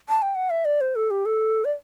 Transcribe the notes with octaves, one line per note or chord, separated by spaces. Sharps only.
A5
G5
F#5
E5
D5
C5
A4
G4
A4
D5